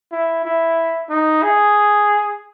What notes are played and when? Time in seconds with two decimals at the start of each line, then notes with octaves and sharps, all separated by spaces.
0.12 E4
0.45 E4
1.10 D#4
1.43 G#4